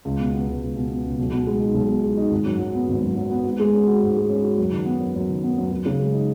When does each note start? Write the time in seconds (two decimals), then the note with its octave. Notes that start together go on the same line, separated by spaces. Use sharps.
0.05 C#2
0.19 B2
0.34 B3
0.48 C#2
0.62 C#2
0.76 B2
0.91 B3
1.04 C#2
1.19 B1
1.33 B2
1.47 G#3
1.60 D#4
1.74 B1
1.89 B2
2.03 G#3
2.17 D#4
2.31 G#1
2.46 F#2
2.59 F#3
2.75 B3
2.89 G#1
3.03 F#2
3.17 F#3
3.31 B3
3.45 G#2
3.60 G#3
3.73 C#4
3.88 F#4
4.02 G#2
4.16 G#3
4.29 C#4
4.44 F#4
4.58 F#2
4.72 D#3
4.86 B3
5.00 F#2
5.15 F#2
5.29 D#3
5.44 B3
5.58 F#2
5.71 F#2
5.86 C#3
6.00 G#3
6.14 D#4